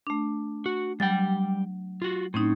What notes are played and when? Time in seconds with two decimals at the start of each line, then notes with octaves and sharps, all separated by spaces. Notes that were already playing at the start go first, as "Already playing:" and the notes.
0.07 A3 D4
0.66 F#4
1.00 F#3 G3 G5 A6
2.02 F4 F#4
2.34 A2 C4 C#4 D#4